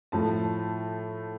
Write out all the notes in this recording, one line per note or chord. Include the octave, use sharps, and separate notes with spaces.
A2 F3 A3 A5